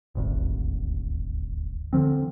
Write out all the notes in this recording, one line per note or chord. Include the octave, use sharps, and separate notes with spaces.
D#1 G#1 D2
D3 D#3 F3 C4